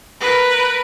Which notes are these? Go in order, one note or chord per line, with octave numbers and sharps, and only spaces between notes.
A#4 B4